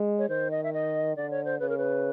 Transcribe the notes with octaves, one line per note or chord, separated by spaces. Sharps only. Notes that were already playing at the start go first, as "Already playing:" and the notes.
Already playing: G#3
C#5
D#3 C5
D#5
E5
D#5
D3 D5
C#5
C5
C#3 B4
A#4
B4